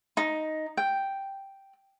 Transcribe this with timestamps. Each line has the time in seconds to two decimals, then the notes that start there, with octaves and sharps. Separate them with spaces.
0.17 D#4
0.77 G5